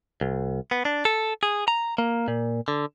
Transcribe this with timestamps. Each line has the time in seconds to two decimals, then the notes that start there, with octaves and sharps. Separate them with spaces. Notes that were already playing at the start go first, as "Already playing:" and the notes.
0.21 C2
0.71 B3
0.85 D4
1.05 A4
1.43 G#4
1.68 A#5
1.98 A#3
2.28 A#2
2.68 D3